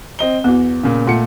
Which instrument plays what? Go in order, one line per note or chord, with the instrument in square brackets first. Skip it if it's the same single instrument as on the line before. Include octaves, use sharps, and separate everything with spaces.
[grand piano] C4 D#5 G7
[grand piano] E2 [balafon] B3 F#4
[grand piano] A#2 C#3
[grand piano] A#2 A3 C#7 [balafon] F4 F#5